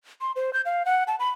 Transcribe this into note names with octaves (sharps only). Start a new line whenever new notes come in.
C6
C5
G6
F5
F#5
A5
B5